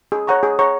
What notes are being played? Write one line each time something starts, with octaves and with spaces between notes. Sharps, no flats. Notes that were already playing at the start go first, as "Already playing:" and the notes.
G#4
C#5 F#5 A#5 C#6
G#4
C#5 F#5 A#5 C#6